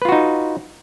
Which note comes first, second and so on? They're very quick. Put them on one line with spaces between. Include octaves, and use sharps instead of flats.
B4 F4 F#4 D#4